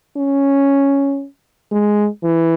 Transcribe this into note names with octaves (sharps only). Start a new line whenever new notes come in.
C#4
G#3
E3